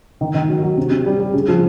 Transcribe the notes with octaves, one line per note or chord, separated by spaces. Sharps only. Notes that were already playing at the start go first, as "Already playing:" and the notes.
D#3
D#3
F#3
F#3
C3
C3
G3
G3
C#3
F3